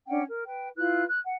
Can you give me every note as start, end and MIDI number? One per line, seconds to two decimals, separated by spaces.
0.07 0.22 61
0.07 0.22 62
0.07 0.22 78
0.07 0.22 79
0.28 0.43 70
0.45 0.68 71
0.45 0.68 79
0.77 1.03 64
0.77 1.03 65
0.77 1.03 71
0.77 1.03 90
1.08 1.19 90
1.24 1.34 78